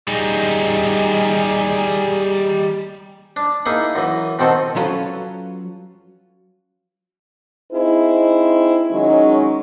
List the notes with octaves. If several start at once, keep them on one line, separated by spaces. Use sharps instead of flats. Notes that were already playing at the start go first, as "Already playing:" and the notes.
G3 D#4 G#4
D4
A#3 D#4 E4 G#4
F#2 E3
B2 D#3 C4 A4
F#3 C#4 F4 A4 B4
C4 D#4 E4 G#4 C5
D#3 F#3 G#3 C#4 D#4